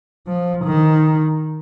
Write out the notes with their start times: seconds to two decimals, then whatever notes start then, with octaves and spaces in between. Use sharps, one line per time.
0.27 F3
0.65 D#3